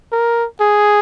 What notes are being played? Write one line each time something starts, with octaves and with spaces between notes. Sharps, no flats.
A#4
G#4